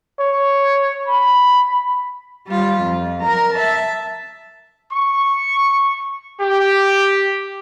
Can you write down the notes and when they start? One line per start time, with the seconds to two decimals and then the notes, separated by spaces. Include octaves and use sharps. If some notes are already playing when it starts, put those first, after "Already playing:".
0.20 C#5
1.08 B5
2.48 G3 F4
2.82 F2
3.22 A#4 A#5
3.55 E5 A5
4.91 C#6
6.40 G4